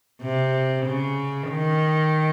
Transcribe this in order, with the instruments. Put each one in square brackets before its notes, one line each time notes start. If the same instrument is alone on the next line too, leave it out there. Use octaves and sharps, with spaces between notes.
[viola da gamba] C3
C#3
D#3